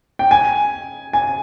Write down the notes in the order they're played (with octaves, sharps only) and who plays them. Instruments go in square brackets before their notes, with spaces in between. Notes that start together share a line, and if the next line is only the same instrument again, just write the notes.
[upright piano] G5
G#5
G#5